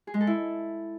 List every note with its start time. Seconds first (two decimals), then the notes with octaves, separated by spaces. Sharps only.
0.07 G#4
0.14 G#3
0.21 A4
0.27 E4